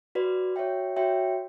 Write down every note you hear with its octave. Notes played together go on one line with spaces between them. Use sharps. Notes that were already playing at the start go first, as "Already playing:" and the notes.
F#4 B4 D5
F#4 C#5 E5 G5
F#4 C#5 E5 G5